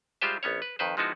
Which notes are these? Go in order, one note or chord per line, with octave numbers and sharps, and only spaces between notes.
G3 G#3 F4 G4 C5 E5
A#1 B3 C#4 C#5
B4
F2 D#3 B4 C5
F3 G#3 B3 D#4 E4 F#4